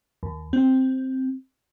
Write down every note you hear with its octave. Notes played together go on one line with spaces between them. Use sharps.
D#2
C4